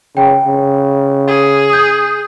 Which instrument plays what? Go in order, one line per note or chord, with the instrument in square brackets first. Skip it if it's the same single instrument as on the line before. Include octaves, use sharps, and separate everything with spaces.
[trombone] C#3 [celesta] G5
[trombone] C#3
[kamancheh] G#4
[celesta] D#6 G6